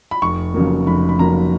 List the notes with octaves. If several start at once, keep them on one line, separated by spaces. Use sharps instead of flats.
B5
F1 C#6
F2 C#3 F#3 A#3
F1 B5
B5
F2 C#3 F#3 A#3 A#5